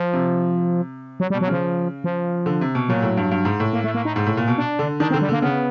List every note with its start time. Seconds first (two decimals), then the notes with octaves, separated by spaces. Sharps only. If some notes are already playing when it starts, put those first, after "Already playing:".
Already playing: F3
0.13 C3
1.20 F#3
1.30 G3
1.34 B2
1.41 F#3
1.48 C#3 F3
2.04 F3
2.46 D3
2.61 C3
2.75 B2
2.89 A#2 F#3
3.02 A2
3.17 G2
3.31 G2
3.45 G#2
3.60 A2
3.73 A#3
3.84 A3
3.95 A#3
4.05 D#4
4.16 G#2
4.27 A2
4.37 A#2
4.48 B2
4.58 D4
4.79 D3
5.00 D#3 D4
5.10 C4
5.14 D3
5.21 G3
5.29 D3 A#3
5.42 C#3 B3